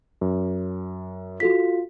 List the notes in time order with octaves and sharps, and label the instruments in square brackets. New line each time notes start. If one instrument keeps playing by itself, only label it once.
[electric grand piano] F#2
[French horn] F4 [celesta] F#4 A4 B6